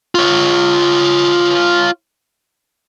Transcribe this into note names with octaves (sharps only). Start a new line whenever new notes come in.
F4 C#5